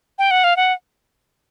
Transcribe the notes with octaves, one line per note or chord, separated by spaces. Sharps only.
G5
F#5
F5
F#5